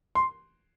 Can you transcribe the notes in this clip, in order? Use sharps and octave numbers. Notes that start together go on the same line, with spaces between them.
C6